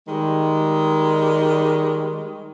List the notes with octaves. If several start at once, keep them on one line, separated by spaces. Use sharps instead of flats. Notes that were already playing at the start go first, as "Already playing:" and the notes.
D#3 G3 G#3